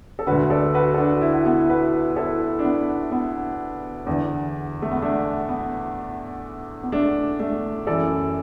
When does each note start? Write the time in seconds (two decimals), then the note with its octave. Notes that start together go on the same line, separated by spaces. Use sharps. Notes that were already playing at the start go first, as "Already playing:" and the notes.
0.19 A4
0.27 D2 D3 F#4 B4
0.50 A4 D5
0.74 F#4 B4
0.94 A4
0.98 D4 F#4
1.21 E4
1.34 F#4
1.46 B3 E4
1.69 F#4 B4
2.16 E4 A4
2.59 D4
2.65 B3
3.12 B3
4.06 E2 D3
4.82 A3
4.91 B3
5.02 A3 D4
5.49 B3
6.83 B3
6.92 A3 D4
7.39 A3 D4
7.87 F#2 E3 A4 D5